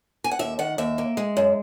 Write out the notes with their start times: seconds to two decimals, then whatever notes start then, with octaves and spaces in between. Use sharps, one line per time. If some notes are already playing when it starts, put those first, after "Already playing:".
0.24 G#5
0.31 F#5
0.39 D#2 E5
0.59 D#3 F#5
0.78 D#2 E5
0.98 A#3
1.17 G#3
1.37 F#2